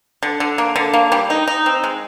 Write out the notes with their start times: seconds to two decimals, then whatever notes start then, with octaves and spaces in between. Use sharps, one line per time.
0.23 D3
0.40 D3
0.58 A#3
0.76 D3
0.94 A#3
1.12 G3
1.30 D#4
1.48 D#4
1.66 C4
1.84 G#3